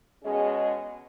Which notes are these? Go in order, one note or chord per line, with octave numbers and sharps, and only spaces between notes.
B2 G#3 C#4 G#4 D#5